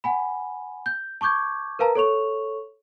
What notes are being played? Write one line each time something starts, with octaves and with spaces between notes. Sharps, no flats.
F#5 G#5 B5
G6
A5 C#6 D6 G6 G#6
A#4 B4 F5 A5 A#5
A4 C#5 C#6 F7